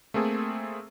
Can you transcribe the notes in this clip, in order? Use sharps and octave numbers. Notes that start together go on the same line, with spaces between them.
A3 A#3 C4 G#4 A4